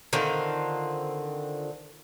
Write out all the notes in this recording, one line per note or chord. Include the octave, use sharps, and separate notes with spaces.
D3 D#3 C4 F4